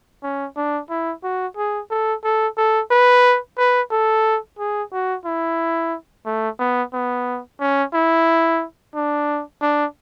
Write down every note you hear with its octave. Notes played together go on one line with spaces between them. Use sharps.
C#4
D4
E4
F#4
G#4
A4
A4
A4
B4
B4
A4
G#4
F#4
E4
A3
B3
B3
C#4
E4
D4
D4